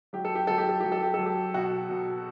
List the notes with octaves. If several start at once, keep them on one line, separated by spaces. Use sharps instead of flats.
F#3 G4
A4
G4
F#3 A4
G4
A4
F#3 G4
A4
G4
F#3 A4
G4
B2 F#4
B2